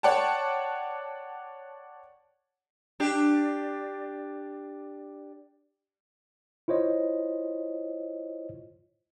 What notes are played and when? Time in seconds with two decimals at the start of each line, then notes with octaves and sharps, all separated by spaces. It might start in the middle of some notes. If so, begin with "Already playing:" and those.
0.03 C#5 D5 F#5 G5 A5
3.00 D4 G4
6.68 E4 F4 C5 C#5 D#5